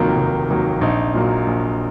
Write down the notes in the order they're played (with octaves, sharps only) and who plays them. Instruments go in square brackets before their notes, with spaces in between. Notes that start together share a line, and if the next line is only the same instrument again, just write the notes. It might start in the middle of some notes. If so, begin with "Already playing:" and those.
Already playing: [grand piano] F1 D#2 D#3 F#3 A#3 F4
F1
D#2 D#3 F#3 A#3
A#1 D#4
A#2 F#3 A#3
A#1